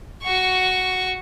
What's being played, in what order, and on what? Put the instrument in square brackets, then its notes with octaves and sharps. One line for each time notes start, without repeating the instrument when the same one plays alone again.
[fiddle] F#4 C#6